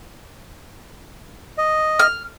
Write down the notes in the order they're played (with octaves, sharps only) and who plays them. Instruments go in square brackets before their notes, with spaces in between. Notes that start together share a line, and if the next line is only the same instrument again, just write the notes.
[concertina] D#5
[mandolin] F6